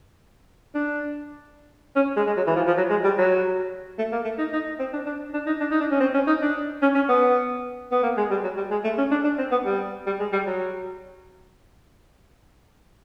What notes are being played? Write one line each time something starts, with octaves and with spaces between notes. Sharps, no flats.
D4
C#4
G#3
G#3
F#3
E3
F3
F3
F#3
G#3
G3
F#3
A3
A#3
A3
D#4
D#4
C4
D4
D4
D4
D#4
D4
D#4
D4
C#4
C4
C#4
D#4
D4
C#4
C#4
B3
B3
A#3
G#3
G3
F#3
G3
G#3
A3
C#4
D4
D4
C4
B3
G3
G3
G#3
G3
F#3